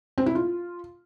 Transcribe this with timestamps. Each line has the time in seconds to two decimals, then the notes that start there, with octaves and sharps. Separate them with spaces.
0.18 C4
0.26 E4
0.35 F4